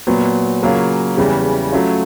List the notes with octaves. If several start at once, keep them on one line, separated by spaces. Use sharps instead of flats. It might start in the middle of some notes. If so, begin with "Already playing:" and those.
A#2 F#3 B3
C#3 F#3 A#3 C#4 F4
E2 C#3 E3 G3
F#3 A3 C#4 F4